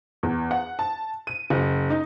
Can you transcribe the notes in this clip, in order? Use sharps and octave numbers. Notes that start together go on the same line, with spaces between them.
E2
F#5
A5
D#7
F#1
D#4